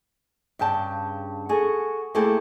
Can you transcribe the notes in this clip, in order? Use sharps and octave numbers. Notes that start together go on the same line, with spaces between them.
G2 C#3 G5 A5
F#4 G#4 A4
A3 A#3 C4 E4 G4 G#4